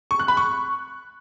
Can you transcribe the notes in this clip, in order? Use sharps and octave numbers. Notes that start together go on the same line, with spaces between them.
C#6
F#6
B5
C#6